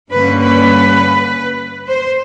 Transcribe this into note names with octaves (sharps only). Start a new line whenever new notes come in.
G2 D3 G3 A#3 C#4 B4
B4
C5